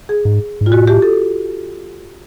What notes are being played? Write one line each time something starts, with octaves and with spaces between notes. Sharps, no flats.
G#4
G#2
G#2
F4
A2 F#4
G4
A4